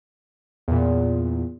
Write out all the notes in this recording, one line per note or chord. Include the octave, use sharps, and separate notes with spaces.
E2 A#2